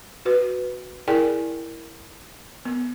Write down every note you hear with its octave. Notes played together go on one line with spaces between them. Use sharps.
F#4 B4
E4 G#4 A#4 D5 G5 G#5
B3